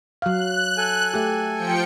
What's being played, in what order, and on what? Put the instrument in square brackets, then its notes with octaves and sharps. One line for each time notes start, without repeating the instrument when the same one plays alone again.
[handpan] F#3 F5 [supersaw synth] F#6
[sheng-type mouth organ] A4 G#5
[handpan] A3 G4
[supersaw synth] F3 G5 C#7